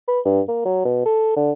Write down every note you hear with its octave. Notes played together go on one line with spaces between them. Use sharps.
B4
G2
A#3
F#3
B2
A4
D3